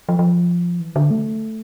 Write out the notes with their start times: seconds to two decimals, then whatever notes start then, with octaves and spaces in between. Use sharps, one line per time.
0.09 F3
0.19 F3
0.80 E3
0.96 D3
1.11 A3